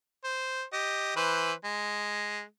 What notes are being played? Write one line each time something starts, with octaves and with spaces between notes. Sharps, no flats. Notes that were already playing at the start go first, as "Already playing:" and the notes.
C5
G4 D#5
E3 B4 C5
G#3